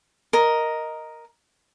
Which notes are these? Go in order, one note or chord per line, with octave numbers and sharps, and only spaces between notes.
A#4 D#5